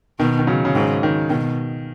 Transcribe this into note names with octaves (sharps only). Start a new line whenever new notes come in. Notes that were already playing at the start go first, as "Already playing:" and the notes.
B2 D#3
D#3
C#3 F#3
C#3
G#2 D#3
D#3
B2 D#3